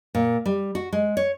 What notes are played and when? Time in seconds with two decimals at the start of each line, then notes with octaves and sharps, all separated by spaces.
0.15 A#2
0.46 G3
0.75 F#4
0.92 G#3
1.17 C#5